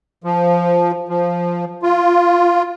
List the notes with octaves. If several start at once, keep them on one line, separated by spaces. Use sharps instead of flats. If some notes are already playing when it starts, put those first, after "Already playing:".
F3
F3
F4